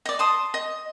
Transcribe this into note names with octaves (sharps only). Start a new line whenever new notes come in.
D5 D#5
A5 C6 D#6
D#5